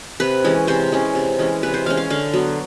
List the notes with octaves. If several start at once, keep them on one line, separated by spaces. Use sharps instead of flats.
C3 B4
E3 G#3 C#4
C3 C5
E3 G#3 C#4
C3
E3 G#3 C#4
C3 B4
C5
E3 G#3 C#4 F5
F5
D3 F5
F#3 B3